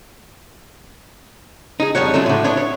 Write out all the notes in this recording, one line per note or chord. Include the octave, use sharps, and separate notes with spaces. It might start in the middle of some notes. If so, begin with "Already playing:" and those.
D#4 G#4
F2 G3 C#5 F#5
F#3 A3 C#4 F4
A2 D3
B3 D4 E4 C#5
C#5